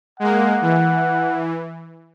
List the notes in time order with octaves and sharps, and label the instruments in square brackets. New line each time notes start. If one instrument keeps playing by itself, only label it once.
[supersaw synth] G#3 A#3 [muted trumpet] F#5
[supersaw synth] E3